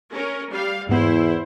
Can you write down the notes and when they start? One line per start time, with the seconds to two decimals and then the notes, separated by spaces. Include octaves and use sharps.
0.11 C#4 A#4
0.52 G3 F5
0.89 E2 G#2 B3 E4 C5